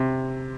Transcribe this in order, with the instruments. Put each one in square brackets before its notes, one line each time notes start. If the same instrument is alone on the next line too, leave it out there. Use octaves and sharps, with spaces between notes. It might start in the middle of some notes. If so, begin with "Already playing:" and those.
Already playing: [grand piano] C3